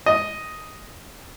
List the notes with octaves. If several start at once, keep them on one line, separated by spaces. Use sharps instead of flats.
D#5